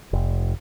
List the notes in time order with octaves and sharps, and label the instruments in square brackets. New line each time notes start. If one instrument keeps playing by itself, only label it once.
[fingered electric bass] F1